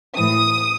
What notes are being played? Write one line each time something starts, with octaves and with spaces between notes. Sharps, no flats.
A2 E3 D#6